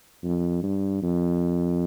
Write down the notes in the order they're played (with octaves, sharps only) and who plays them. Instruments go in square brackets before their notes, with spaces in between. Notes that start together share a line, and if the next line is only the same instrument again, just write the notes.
[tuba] F2
G2
F2